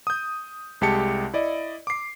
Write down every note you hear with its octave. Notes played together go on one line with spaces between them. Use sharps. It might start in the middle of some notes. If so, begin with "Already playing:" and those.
D#6 G6
C2 G#3 G4 A5 C#7
E4 D5 D#5
D6 C7